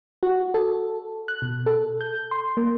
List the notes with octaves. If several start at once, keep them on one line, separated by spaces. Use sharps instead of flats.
F#4
A4
F#6
B2
A4
G6
C6
A#3